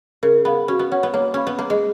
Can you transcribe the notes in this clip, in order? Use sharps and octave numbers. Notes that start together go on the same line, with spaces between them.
C#3 A#4
B3 F5 B5
C#4 F#4
B3
C#4 C#5 F#5
B3
A#3 C#5
C#4 F5 B5
B3
A#3 G#4
G#3